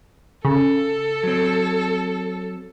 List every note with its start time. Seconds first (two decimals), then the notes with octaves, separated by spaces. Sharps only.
0.45 C#3 A4
1.23 F#3 C4